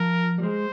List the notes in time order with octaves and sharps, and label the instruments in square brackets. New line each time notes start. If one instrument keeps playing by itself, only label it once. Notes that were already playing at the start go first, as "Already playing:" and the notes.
Already playing: [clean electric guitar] F3 [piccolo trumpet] A#4
[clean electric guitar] G3
[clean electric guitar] G#3 [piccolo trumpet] C5